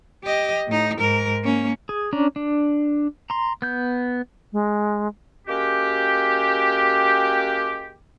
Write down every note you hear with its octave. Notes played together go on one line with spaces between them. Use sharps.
G4 D#5
A2 D#4
G#2 A#4
A#3 C#4
G#4
C#4 D4 A#5
D4
A#5 C6
B3 G6
G#3
G#3 A#3 C#4 F#4 G4